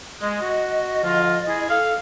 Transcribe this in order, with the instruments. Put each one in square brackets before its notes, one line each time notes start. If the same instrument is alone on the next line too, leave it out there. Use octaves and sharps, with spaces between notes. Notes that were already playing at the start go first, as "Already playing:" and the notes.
[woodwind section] G#3 [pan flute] D#5
[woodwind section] F#4
D3 F3 F4
E4 G#4
[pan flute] A4 [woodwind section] F5